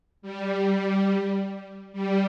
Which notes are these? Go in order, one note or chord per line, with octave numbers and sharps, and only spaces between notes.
G3
G3